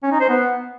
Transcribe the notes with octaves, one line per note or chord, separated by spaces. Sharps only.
C#4
D#4
C5
B3